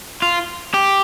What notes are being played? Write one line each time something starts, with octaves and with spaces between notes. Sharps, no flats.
F4
G4